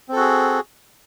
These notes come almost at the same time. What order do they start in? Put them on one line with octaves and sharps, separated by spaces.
C4 A4 F#4 G#4